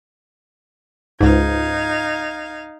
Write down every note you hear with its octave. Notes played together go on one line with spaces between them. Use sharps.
C#2 G#2 D#4 F5 G#6